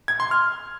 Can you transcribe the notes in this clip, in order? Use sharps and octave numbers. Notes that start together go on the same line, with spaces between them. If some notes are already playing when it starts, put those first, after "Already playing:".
G#6
C6
F6